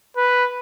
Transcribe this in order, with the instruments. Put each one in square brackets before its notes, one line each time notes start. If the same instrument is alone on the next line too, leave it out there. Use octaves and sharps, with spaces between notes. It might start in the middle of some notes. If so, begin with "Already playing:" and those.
[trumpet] B4